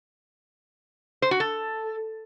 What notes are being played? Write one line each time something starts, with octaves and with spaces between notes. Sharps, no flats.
C5
F#4
A4